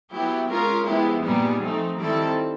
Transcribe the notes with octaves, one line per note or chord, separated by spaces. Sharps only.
F#3 B3 E4 G4
G#3 C#4 F4 A#4
F3 G#3 B3 E4 G4
A#2 G3 B3 D#4 G#4
F3 A3 C4 D#4
D#3 G3 C4 E4 A4